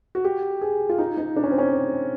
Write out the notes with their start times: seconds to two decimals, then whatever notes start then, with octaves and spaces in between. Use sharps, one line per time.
0.15 F#4
0.24 G4
0.61 G#4
0.90 F4
0.98 D#4
1.17 D#4
1.36 D4
1.44 C#4
1.51 C4
1.58 C#4